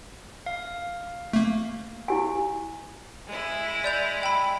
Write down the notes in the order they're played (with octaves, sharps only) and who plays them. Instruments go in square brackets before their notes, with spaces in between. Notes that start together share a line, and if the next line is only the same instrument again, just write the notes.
[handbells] F5
[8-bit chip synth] A3 A#3
[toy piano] E4 G4 G#5
[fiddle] G#3 E4
[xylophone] D5 G6 F7
G5 B5